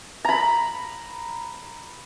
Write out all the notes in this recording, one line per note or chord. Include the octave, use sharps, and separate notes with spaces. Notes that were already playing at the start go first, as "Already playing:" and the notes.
A#5 B5